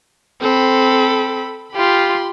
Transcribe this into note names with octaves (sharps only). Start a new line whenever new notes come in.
C4 A4 B5
F4 G4 B5 C6